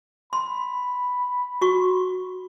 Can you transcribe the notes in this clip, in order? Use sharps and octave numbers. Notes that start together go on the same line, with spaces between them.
B5 C6
F#4 C#6